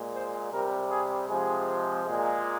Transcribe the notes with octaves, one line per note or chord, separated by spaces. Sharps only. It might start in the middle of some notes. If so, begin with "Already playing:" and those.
Already playing: A#2 G#3
C5
C3 G3 A#4
G#4
C3 F3 G#3 G#4
A#2 G#3